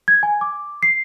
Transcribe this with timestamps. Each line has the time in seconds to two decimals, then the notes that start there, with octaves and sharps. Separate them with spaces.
0.08 G#6
0.23 G#5
0.41 D6
0.83 C7